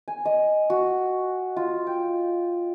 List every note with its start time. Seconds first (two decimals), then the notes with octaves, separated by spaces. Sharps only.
0.08 G#5
0.25 D#5
0.70 F#4
1.57 F4
1.87 G5